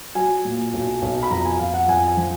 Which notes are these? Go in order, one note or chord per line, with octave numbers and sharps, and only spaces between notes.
F#3 G#5
A#2
B1
B1
B5
F2 A#5
G#5
F2 F5
F#5
F2 G#5
G#5
F3